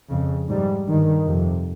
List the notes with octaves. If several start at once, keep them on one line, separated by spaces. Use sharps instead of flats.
F2 C#3
G#2 G3
G2 D#3
F2 C3